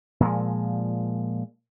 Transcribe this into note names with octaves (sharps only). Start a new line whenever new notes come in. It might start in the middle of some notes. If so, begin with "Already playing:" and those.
A#2 F3 G#3